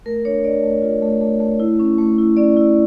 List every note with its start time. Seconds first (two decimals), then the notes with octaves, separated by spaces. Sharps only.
0.06 A3 A#4
0.25 D4 C#5
0.44 D4 D5
0.63 A3
0.82 F4
1.02 A3
1.21 A3
1.40 A3
1.60 E4
1.79 C#4
1.98 A3
2.18 E4
2.37 C#4 D5
2.57 E4